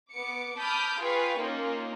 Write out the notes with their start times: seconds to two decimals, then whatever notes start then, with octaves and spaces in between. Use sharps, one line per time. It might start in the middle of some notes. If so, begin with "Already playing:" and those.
0.12 B3 D6 C#7
0.58 A5 B5 D6 D#6 F6 G6
1.00 F4 G#4 B4 F5 G5 C#6
1.37 A#3 C#4 D#4 F4